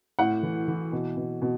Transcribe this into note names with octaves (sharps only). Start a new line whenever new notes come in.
A2 F#5
E3
E3
B2
B2
B2